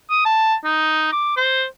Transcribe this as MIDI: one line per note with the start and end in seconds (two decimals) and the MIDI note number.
0.10 0.23 87
0.25 0.55 81
0.65 1.09 63
1.13 1.35 86
1.37 1.65 72